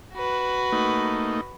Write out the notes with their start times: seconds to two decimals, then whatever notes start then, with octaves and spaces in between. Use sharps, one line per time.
0.14 F#4 B4
0.72 A3 A#3 D#4